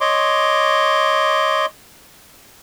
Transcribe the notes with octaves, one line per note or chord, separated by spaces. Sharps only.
C#5 D#5 C6 D6